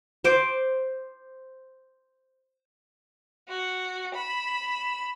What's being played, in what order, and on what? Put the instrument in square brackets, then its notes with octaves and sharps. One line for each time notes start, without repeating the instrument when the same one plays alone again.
[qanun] C5 D6
[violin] F#4
B5 E7